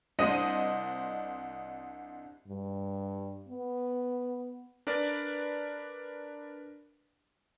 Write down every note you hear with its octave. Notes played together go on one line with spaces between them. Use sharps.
C2 D4 C5 D#5 A#6 D#7
G2
B3
D4 A#4 B4 D5